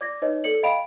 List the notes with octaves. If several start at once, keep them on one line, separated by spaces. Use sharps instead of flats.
D5 D6 G#6 A#6
D#4 B4 C#5 D#5
A4 D5 C#7 F#7
D#5 F5 G5 B5 D7 F7